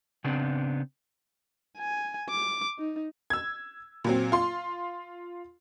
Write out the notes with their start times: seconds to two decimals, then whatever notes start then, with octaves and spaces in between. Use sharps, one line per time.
0.24 C#3 B3 C4 D4
1.78 G#5
2.30 D6
2.79 D#4
3.30 E6 G#6
4.04 A#2 F#3 C4
4.32 F4 C6